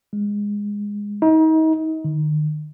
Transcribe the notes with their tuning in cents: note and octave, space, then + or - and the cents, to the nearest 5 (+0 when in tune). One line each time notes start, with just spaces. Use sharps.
G#3 -15
D#4 +35
D#3 -40